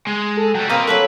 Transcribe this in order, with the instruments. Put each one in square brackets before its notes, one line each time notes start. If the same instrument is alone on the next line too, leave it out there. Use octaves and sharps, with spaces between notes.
[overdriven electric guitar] G#3
[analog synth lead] A4
[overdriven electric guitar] F#3 G3 [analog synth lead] G5
[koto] A#3 C4 [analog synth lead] A#4 [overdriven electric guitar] B4 D#5
[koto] F#3 A#3 E5 [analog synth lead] A4 [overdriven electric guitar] B4